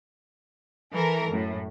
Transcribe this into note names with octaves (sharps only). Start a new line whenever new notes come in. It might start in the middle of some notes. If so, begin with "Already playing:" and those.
E3 A4 A#4 A#5
F#2 A2